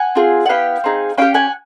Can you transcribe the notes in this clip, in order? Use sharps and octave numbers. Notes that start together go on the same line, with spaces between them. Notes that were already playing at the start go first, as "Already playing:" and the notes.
Already playing: F#5 G#5
C4 F4 G#4
F#5
B3 E4 G4 F5 G5
C4 D#4 G#4
C#4 E4 G4 F5 G5
F#5 G#5